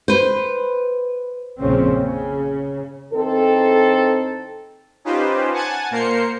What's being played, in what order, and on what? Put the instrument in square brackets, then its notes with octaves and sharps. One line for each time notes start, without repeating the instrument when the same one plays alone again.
[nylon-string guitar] B4 C5
[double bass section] A#1 F2 A#2 C#3 C4 C#4
C#3
[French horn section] E2 C4 D#4 A4
[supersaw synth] C#4 D#4 F4 G4 B4 C5
F#5 G#5 A5 F#6 G#6 A6
A#2 A#3 A#4 C5 C7 C#7